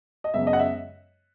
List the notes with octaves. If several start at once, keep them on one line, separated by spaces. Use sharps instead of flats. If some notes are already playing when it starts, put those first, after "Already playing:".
D#5
F#2 C#3 G#3 B3 E5
D#5
F#5
E5